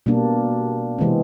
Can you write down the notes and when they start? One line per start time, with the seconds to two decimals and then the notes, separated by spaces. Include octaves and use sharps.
0.06 B2 G3 A#3 D4
0.98 C3 E3 G#3 C4